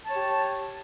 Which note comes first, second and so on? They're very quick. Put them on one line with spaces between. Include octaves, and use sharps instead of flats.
A5 C#5 G4